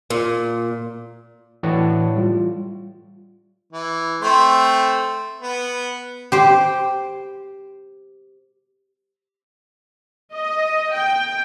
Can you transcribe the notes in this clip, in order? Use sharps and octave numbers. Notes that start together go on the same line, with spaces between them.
A#2
A2 E3 D4 F#4
G3 F4
E3
A3 C4 C5
B3
G4 C5 G5
D#5
G5